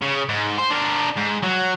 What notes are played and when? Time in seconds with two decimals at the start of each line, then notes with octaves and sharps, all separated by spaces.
0.02 C#3
0.29 G#2
0.58 C5
0.71 D4 A#4
1.17 G#2
1.43 F#3